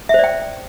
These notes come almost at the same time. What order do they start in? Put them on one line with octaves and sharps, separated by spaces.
E5 C5 D5 G5